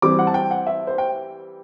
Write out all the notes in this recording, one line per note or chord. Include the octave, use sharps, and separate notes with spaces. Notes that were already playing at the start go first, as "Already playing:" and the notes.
E3 G3 C4 D6
F#5
A5
G5
F#5
E5
C5
G5